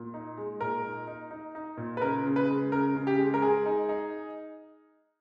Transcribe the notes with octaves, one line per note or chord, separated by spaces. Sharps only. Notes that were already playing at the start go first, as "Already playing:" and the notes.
Already playing: A#2
D#4
G#3
A#2 A#4
D#4
D#4
D#4
D#4
A#2
B4
C#3 A#4
C#3
B4
G#3
C#3 A#4
C#3
G4
G#3
A#4
G#3 G#4
D#4
D#4